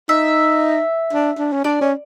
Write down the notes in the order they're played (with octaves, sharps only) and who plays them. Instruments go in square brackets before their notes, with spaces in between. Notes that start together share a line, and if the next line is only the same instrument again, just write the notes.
[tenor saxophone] D#4 [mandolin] E5
[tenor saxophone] D4
D4
C#4
[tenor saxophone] D4 [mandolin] D5
[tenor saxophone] C#4